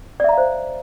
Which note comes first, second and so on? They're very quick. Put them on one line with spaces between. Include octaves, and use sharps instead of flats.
D5 E5 A#5 F5 C5